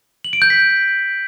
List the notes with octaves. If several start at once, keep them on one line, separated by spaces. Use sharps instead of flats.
F#7
D7
G6
B6